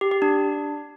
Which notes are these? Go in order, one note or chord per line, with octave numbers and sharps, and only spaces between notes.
G4
G4
D4